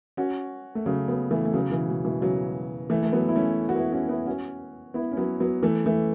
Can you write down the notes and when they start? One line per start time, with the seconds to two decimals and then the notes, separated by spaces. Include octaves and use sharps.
0.17 C#4 F#4
0.75 A3
0.86 C#3 F#3
1.08 F#3 B3
1.31 E3 A3
1.45 A3
1.53 C#3 F#3
1.70 B2 E3
1.88 B2
2.05 B2 E3
2.21 C#3 F#3
2.90 E3 A3
3.03 A3
3.13 F#3 B3
3.29 E4
3.36 A3 C#4
3.69 F#4
3.76 B3 E4
3.92 C#4 F#4
4.09 B3 E4
4.26 C#4 F#4
4.94 B3 E4
5.12 C#4
5.17 F#3 B3
5.40 F#3 B3
5.63 E3 A3
5.86 E3 A3